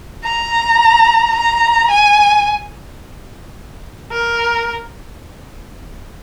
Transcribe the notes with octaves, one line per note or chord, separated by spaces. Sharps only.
A#5
A#5
G#5
A#4